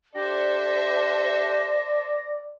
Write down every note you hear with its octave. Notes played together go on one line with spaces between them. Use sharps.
D4 G4 A4 C5 D5 E5 A#6